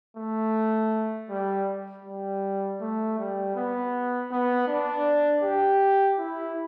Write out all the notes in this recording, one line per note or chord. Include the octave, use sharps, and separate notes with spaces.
A3
G3
G3
A3
G3
B3
B3
D4
G4
E4